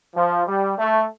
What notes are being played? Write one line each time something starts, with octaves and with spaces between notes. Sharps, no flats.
F3
G3
A3